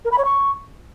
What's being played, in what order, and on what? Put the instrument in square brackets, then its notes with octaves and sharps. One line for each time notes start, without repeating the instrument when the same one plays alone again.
[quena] A#4
B5
C#5
C#6